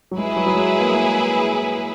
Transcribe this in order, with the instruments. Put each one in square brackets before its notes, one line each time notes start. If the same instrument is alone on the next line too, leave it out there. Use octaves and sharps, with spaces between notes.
[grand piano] F#3
[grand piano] G#3 [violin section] E4 G#4 B4
[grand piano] F#3
F#3
G#3
A#3
G#3